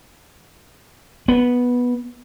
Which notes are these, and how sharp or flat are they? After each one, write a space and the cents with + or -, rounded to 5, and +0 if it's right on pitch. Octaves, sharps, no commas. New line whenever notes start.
B3 -10